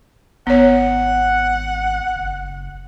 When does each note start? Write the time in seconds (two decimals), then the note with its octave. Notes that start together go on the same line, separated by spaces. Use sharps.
0.47 G#1 B3 C#5 F#5
2.16 F#1